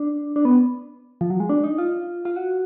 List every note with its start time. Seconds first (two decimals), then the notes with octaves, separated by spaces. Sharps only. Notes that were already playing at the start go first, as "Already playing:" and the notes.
Already playing: D4
0.36 D4
0.45 B3
1.21 F3
1.30 F#3
1.40 G#3
1.49 D4
1.64 D#4
1.78 F4
2.25 F4
2.36 F#4